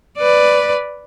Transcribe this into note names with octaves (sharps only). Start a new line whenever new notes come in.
B4 D5